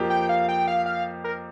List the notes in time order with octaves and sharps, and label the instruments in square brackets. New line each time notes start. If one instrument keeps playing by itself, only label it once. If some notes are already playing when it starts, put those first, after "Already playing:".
Already playing: [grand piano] F2 F3 A#3 G4
[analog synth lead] G5
F5
G5
F5
F5
A#4